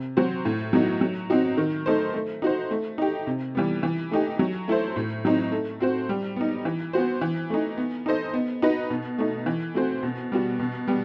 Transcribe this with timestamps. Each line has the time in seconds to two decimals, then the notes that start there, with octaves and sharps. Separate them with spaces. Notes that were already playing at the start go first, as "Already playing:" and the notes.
Already playing: C3
0.17 F#3 C4 F#4 C5
0.45 A2
0.73 F#3 B3 D#4 F#4
1.01 F#3
1.30 C4 D#4 F#4
1.57 D#3
1.86 A3 D#4 A4 C5
2.14 A3
2.42 D#4 F#4 C5
2.71 A3
2.98 D#4 G4
3.27 C3
3.55 E3 G3 B3
3.83 E3
4.12 A3 D#4 G4
4.39 F#3
4.68 A3 E4 A4 C5
4.96 A2
5.25 F#3 C4 D#4
5.52 A3
5.80 C4 F#4 C5
6.09 G3
6.36 B3 D#4
6.65 E3
6.93 B3 F#4 C5
7.21 E3
7.50 A3 D#4
7.78 B3
8.06 D#4 A4 C5 D#5
8.33 B3
8.62 D#4 F#4 B4 D#5
8.90 B2
9.18 A3 D#4
9.46 E3
9.75 A3 C4 F#4 C5
10.03 B2
10.32 G3 B3 F#4
10.59 B2
10.88 G3 B3